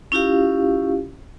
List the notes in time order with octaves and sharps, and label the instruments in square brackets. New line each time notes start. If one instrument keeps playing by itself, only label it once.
[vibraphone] C#4 E4 F4 G4 F5